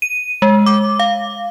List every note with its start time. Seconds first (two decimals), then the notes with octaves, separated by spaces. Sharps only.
0.02 D#7
0.42 G#3
0.66 D6
0.99 F5